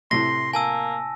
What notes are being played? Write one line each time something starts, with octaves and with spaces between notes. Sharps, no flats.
A2 C3 A3 C6 A#6
A#3 G#5 A5 E6